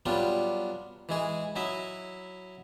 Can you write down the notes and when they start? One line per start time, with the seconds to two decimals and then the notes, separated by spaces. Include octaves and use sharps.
0.06 F#3 G3 B3 D4 F4
1.09 E3 G#3 G#4
1.56 F#3 E4 D#5 E5